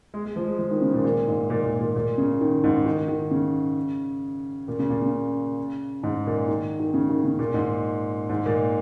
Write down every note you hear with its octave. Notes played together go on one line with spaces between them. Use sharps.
G#3
G#3
F3
G#3
F3
D#3
C#3
A#2
A#2
G#2
A#2
A#2
A#2
A#2
C#3
D#3
G#2
D#3
D#3
C#3
A#2
C#3
A#2
C#3
G#2
A#2
D#3
D#3
C#3
D#3
C#3
A#2
G#2
G#2
A#2